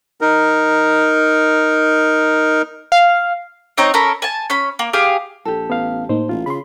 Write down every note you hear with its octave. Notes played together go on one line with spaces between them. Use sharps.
D#4 A#4
F5
C4 D#4 C#5 A#5
C#4 A4 A#4 B5
G#5 A5
C#4 B5
A#3
G4 G#4 F5
A#1 G4 A4
A1 B3 F5
A2 A#3 D#4 C5
A1 F4
C#3 B5 C6